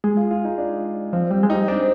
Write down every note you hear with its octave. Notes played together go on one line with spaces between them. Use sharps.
G#3 G#4
F4
F4
D#4
D4
F3 C4
G3 C4
G#3
G3 D#4
C4 D4